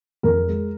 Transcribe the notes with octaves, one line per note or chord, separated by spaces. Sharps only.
F2 A#4
G#3